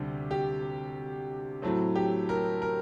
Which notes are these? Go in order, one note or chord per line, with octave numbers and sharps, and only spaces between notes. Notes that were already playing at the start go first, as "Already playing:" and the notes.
Already playing: D2 C3 G3
G4
A2 F#3 A3 C4
G4
A#4
A#4